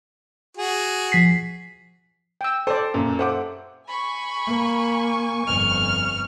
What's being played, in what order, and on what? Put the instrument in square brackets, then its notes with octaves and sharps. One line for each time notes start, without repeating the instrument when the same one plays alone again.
[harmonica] F#4 G#4
[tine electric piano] F3 B6 C7
[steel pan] G5 E6
[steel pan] A4 D5 [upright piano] C5
[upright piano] F#2 A#2
[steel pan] A4 C5 [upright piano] E5 F#5 D6
[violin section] G#5 C#6 [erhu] B5
[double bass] A#3
[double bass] G1 F2 [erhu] F6